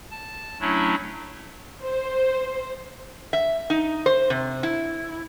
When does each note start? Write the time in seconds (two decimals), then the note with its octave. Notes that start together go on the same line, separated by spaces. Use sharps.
0.11 A5
0.60 F#3 A3 C#4 D4 E4
1.84 C5
3.33 E5
3.70 D#4
4.06 C5
4.30 C3
4.63 E4